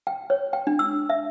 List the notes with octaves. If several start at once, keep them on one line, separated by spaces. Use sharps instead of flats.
G5
C#5
G5
D4
E6
E5